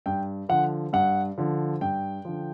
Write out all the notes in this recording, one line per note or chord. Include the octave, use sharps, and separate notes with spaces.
G2 G5
D3 F3 F#5
G2 F#5
D3 F3
G2 G5
D3 F3